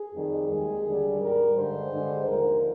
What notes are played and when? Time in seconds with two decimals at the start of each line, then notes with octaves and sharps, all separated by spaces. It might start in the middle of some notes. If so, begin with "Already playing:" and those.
Already playing: G#4
0.13 F2 D#3 G3
0.49 D#2 D#3 G#3
0.85 D#2 D3 G3
1.20 G#2 G3 A#4
1.56 G2 D3 G#3 C5
1.92 G2 D3 G#3
2.27 D#2 D3 F3 A#4